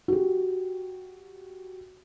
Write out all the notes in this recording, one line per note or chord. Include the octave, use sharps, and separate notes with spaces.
F#4 G4